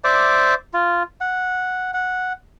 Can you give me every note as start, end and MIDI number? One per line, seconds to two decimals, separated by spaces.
0.04 0.54 72
0.04 0.54 74
0.04 0.54 76
0.04 0.54 86
0.73 1.03 65
1.21 1.91 78
1.94 2.33 78